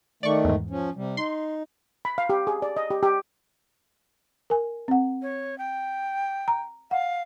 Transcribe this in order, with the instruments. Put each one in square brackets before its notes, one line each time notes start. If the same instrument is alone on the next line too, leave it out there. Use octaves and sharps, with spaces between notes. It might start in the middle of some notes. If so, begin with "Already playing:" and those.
[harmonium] D#3 A3 [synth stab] D5 C#6
[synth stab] E2 G#2
[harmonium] F3 C#4
C3 G3
[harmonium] D#4 [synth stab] C6
[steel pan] B5
F5
G4
G#4
D5
D#5
G4
G4
[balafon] A#4 G#5
C4 F#5
[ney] C#5
G5
[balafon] A#5
[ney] F5 [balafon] F#5